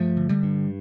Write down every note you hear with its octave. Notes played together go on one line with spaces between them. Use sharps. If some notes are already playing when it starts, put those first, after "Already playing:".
Already playing: G2 F3 A3
D3
D3 G3
G2